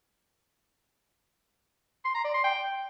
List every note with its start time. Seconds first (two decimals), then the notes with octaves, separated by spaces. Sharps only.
2.05 C6
2.15 A#5
2.24 D5
2.34 C6
2.44 G5